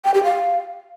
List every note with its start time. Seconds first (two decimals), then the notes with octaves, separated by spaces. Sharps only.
0.05 G5
0.14 G4
0.23 F5